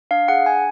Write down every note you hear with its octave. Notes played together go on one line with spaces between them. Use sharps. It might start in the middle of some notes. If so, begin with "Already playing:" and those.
D4 F5
G#4 F#5
D4 G#5